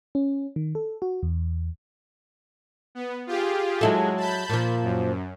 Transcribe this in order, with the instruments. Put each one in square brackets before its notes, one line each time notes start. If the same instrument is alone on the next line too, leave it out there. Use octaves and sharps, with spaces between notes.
[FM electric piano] C#4
D#3
A4
F#4
E2
[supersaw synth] B3
F4 G4 G#4
[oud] F#3 E4 A4 [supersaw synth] G#3
[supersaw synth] A5 B5 G6
[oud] A#2 F3
[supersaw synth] F#2